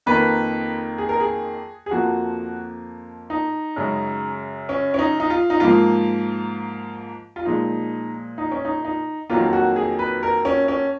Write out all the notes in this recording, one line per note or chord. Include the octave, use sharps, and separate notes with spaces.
F2 D#3 A#3 B4
G#4
A#4
G#4
G#4
F2 F3 A#3 F#4
D#4
F#2 C#3 G#3
C#4
C#4
D#4
D#4
F4
D#4
G#2 F3 A#3 F4
F4
A#2 F3 G#3 D#4
D#4
C#4
D#4
D#4
F2 D#3 F#3 A#3 F4
F#4
G#4
B4
A#4
C#4
C#4